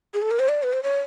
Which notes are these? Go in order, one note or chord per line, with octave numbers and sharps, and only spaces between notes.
G#4
A4
A#4
C5
D5
B4
C5
C#5